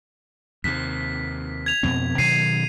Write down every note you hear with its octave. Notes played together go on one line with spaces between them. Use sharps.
D#2 C3 B6
G#6 F7
F2 B2 C4
B2 D#3 F#3 C7 D#7